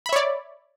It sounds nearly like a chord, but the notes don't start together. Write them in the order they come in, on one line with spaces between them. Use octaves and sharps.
B5 E5 C#5 D5